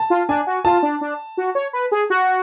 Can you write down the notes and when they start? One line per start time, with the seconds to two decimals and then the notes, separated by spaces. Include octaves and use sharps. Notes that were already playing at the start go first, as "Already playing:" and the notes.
Already playing: A5
0.10 F4
0.29 D4 G#5
0.47 F#4
0.65 F4 A5
0.83 D4
1.01 D4
1.37 F#4
1.55 C#5
1.73 B4
1.92 G#4
2.10 F#4